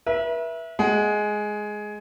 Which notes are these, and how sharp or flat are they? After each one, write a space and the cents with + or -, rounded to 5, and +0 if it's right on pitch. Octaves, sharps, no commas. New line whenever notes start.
B4 -40 E5 +0
G#3 +10 F#5 +20